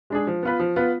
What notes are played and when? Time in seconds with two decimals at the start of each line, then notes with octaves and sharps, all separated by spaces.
0.10 G#3 D4 G#4
0.27 F3
0.43 B3 F4 B4
0.59 F3
0.76 B3 F4 B4